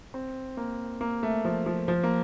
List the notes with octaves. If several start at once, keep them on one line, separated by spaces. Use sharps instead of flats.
C4
A#3
A#3
A3
F3
F3
F3
A#3